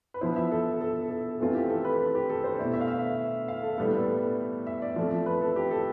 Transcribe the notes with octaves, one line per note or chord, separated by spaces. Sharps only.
B4
F3 B3 E4 C5
E5
A4
A4
A4
E3 A3 C4 F4 A4
G4
A4
B4
A4
G4
A4
C5
B2 A3 E4 D5
E5
F5
E5
F5
A4
A2 G3 B3 A4
A4
B4
E5
D5
F3 A3 C4
B4
A4
G4
A4